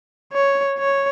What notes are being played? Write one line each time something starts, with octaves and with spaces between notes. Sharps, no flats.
C#5
C#5